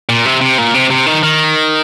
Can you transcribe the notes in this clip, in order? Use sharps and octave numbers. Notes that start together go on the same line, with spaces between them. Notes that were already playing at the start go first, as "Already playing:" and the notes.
A#2
C3
C3
A#2
C3
C3
D#3
D#3